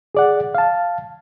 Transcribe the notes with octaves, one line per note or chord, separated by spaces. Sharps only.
G#4 D5 F#5
F5 A5